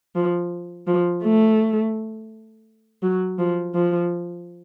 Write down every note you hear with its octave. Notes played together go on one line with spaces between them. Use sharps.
F3
F3
A3
F#3
F3
F3